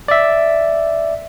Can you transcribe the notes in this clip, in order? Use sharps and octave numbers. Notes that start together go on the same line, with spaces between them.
D5 E5